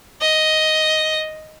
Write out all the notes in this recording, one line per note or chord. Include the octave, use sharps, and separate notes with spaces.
D#5